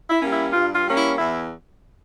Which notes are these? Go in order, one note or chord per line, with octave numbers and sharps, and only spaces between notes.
E4
G3 A#3 C#4
E4
G2 F4
F4
G3 A#3 C#4
E4
E2 E4